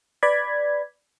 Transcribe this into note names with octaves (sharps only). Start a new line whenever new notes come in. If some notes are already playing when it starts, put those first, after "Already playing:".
B4 D5 B5 G#6